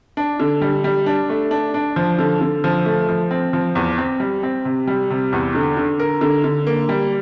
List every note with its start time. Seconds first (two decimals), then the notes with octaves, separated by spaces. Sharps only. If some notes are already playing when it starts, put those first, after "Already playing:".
0.17 D4
0.40 D3
0.61 G3
0.84 G3
1.06 D4
1.29 A3
1.51 D4
1.74 D4
1.96 F3
2.19 D3
2.41 D3
2.64 F3
2.86 A3
3.09 F3
3.31 C4
3.53 F3
3.75 E2
3.98 C4
4.20 G3
4.43 C4
4.65 C3
4.87 G3
5.10 C3
5.33 E2
5.55 D3
5.77 D3
6.00 A#4
6.21 D3
6.44 D3
6.67 A#3
6.89 G3